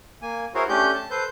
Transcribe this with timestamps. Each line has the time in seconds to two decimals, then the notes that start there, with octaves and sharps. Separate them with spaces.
0.22 A#3 G#5
0.54 E4 F#4 G#4 A#4 C5 C#5
0.69 A3 C#4 D4 G4 G6
0.94 A5
1.11 A4 B4 C5 G6